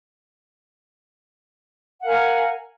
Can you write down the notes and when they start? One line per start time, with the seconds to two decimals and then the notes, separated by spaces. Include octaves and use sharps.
2.00 F#5
2.02 F5
2.05 A#4
2.08 G#5